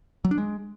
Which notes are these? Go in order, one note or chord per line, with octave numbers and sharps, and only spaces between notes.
F#3
D4
G#3